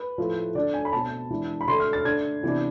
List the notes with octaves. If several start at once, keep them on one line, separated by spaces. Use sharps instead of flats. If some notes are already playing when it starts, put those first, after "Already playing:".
Already playing: B4
A2 F3 A3
D3 A3 D4 D5
G#5
B5
B2 A3 C4 A5
E3 G#3 D4
B5
D3 A3 D4 C6
F6
A6
D3 A3 D4 G#6
C3 E3 B3 D4